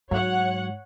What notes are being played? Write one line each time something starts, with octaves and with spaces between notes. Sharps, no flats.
G#2 F#3 C#5 F#5